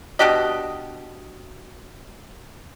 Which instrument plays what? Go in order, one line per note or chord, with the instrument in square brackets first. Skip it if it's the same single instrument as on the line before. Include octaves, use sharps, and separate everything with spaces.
[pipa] B2 D4 G4 D#5